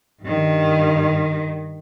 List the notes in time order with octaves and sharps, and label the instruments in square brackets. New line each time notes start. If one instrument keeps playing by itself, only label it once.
[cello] G2 D#3